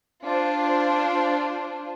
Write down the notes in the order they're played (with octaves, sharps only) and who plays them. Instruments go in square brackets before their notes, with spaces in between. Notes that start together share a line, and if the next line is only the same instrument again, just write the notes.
[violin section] D4 F4 C5